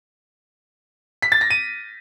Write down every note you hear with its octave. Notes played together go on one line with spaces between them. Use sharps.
B6
A6
A#6
D#7